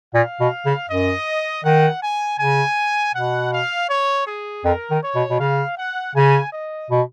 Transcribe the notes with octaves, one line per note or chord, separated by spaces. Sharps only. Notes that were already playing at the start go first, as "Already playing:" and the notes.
A#2 F5
B2
C#3
F#2 D#5
D#3 F#5
G#5
C#3 G#5
B2 F#5
F5
C#5
G#4
F2 A#4
D#3
C#5
B2
B2
C#3 F5
F#5
C#3 G#5
D#5
B2